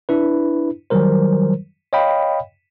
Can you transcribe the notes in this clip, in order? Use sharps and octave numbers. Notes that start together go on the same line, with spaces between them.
D4 E4 B4
D#3 F#3 G3 A#4 C5
C#5 D#5 F5 G5 B5